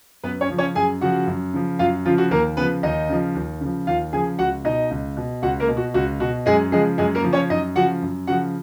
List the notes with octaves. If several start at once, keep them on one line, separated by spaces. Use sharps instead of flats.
F#2 B3 B4
C#4 C#5
C#3 F3
C#4 C#5
F#2 G#4 G#5
C#3 F3 F#4 F#5
F#2
C#3 F3
F#2 F4 F5
C#3 F3 F4
F#4
D#2 A#3 A#4
C#3 F3 B3 B4
D#2 D#4 D#5
C#3 F3
D#2
C#3 F3
D#2 F4 F5
C#3 F3 G#4 G#5
C#2 F#4 F#5
B2 D#4 D#5
C#2
B2
C#2 F#4 F#5
A#3 A#4
B2
F#4
C#2 F#4
B2 F#4
F#2 G#3 G#4
C#3 F3 G#3 G#4
F#2 G#3 G#4
A#3 A#4
C#3 F3
C#4 C#5
F#2 D#4 D#5
C#3 F3 F#4 F#5
F#2
C#3 F3 F#4 F#5